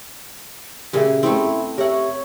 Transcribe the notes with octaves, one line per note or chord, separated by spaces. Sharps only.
A#2 C#3 G4 G#4 E5
A3 B3 C4 E4
G4 A#4 C#5 E5 F#5